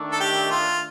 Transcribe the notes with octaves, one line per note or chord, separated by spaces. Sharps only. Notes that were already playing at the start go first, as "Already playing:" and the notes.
Already playing: D#3 A3 D4
A4
G4
F4